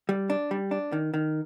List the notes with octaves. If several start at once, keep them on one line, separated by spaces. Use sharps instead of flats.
G3
D4
G3
D4
D#3
D#3